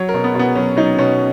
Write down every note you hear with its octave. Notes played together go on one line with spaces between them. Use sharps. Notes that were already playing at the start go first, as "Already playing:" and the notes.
Already playing: F#3 C#5
A#4
B2
B3
B2
B3
F#3 C#4
F#3 D#4
B2 C#4